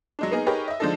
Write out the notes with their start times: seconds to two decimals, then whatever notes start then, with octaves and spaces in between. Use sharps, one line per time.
0.19 F#3 G#3 D4
0.31 A#3 B3 D#4 G#4 A#4
0.46 D#4 G4 G#4 A#4 B4 C#5
0.68 D#5 E5
0.80 D3 F3 G#3 D4 D#4 A4